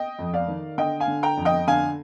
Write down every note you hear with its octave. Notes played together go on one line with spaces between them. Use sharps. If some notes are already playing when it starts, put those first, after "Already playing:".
Already playing: D#5 G5
F2
D5 F5
D#3
D3 D#5 G5
F5 G#5
D3
G5 A#5
F2
D#5 G5
D3 F5 G#5